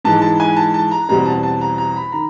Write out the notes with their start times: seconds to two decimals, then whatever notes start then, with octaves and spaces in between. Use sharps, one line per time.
0.05 G#2 E3 G#3 A5
0.22 A5
0.40 G#5
0.56 A5
0.74 A5
0.91 A#5
1.09 E2 B2 G3 C4 A#5
1.25 A5
1.43 A5
1.61 A#5
1.78 A#5
1.96 B5
2.12 D#3 A#5